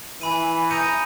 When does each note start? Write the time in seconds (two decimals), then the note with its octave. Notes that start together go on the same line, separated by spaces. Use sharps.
0.21 E3 G#5 B5 D#7
0.71 A#5 D#6 G6 C#7 D#7